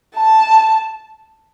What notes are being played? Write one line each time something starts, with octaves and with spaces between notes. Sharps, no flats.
A5